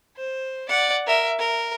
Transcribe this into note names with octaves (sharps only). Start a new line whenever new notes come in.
C5
D5 F#5
A#4 E5
A#4